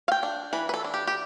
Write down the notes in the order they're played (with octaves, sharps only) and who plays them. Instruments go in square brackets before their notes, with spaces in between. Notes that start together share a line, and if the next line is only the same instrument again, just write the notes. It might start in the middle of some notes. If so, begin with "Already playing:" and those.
[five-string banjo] F5
G5
D4
E3 B4
B4
A4
D4
G4
G4